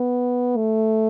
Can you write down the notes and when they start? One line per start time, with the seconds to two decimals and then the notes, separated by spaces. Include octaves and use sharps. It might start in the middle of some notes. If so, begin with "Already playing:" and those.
Already playing: B3
0.56 A3